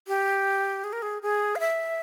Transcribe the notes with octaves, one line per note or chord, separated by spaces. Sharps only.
G4
G#4
A#4
G#4
G#4
F5
E5